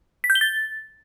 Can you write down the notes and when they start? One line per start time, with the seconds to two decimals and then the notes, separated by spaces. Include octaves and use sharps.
0.24 B6
0.30 G6
0.35 G7
0.41 A6